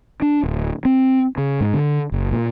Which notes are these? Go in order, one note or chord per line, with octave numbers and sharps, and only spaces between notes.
D4
D1
C4
C#3
G#2
D3
F#1
A#2